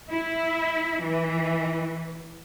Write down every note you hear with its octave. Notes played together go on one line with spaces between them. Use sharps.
E4
E3